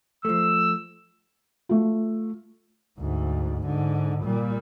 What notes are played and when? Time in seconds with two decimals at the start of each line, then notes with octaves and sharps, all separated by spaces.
0.25 F3 A3 E6
1.69 A3 F4
2.98 D2 G#2
3.65 G#2 D3
4.24 A#2 G3